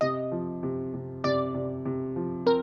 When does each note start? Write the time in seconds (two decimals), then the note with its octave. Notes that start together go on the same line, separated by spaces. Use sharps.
0.01 C3 D#5
0.32 F3
0.63 C3
0.94 C3
1.24 C3 D5
1.54 C3
1.85 C3
2.16 F3
2.46 C4 A#4